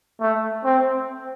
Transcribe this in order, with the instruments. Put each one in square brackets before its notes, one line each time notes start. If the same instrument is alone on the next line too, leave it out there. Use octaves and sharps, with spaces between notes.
[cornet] A3
C4